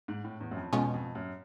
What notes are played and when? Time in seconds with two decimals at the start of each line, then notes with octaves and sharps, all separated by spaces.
0.08 G#2
0.24 A2
0.40 E2
0.51 F#2
0.57 F2
0.73 E2 B2 G#3 C#4 F4
0.94 F2
1.15 F#2